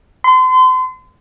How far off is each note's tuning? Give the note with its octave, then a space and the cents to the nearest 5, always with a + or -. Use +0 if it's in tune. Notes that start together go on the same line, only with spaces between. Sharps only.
C6 -35